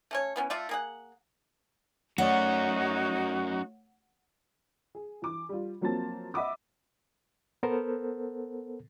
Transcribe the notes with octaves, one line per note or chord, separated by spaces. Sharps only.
A3 C#4 C#5
E3 B3 C#4
A3 F4 D5 E5
A#3 G#4 F#5
F#3 A3 C#4 D#4 F#4 C#5 D5 F#5
G#4
E3 D6
G3 F4
F3 F#3 A#3 C4 A5 A6
D#5 E5 F#5 B5 D6 D#6
B3 A4 A#4 C5